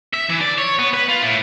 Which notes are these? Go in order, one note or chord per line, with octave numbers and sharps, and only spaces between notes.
E5
E3
D5
C#5
B3
B4
F4
A2